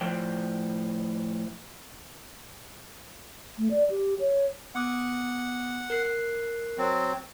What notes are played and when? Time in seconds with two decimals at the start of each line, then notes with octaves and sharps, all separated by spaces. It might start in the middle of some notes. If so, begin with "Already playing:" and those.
0.01 A2 F3 C5 G5
3.58 A3
3.71 D5
3.90 G4
4.19 C#5
4.75 B3 F#5 D6 D#6
5.90 A#4 F#6 C7
6.78 F#3 C4